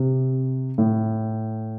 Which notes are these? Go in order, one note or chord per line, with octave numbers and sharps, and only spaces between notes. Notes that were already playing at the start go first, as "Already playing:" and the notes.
Already playing: C3
A2